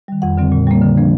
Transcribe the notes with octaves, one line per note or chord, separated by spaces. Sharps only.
D#3 G3
F2 F#5
D3 G3 C4
A#2
G3 A#3
D3
F3 A#3 D4